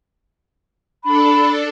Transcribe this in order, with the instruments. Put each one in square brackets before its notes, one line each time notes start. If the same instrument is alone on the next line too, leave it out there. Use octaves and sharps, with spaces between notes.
[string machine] D4 A4 [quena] B5